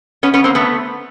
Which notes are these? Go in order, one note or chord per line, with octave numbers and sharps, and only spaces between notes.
B3 C#4
B3 C#4
A#3 C4
A3 B3